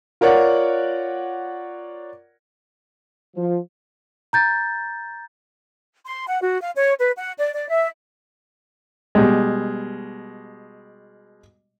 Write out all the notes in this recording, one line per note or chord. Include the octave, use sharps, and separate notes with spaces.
F4 A#4 C#5 D5 F#5
F3
A#5 G6 A6
C6
F#5
F#4
F5
C#5
B4
F#5
D5
D5
E5
B2 G3 G#3